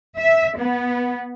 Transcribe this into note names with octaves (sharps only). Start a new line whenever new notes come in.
E5
B3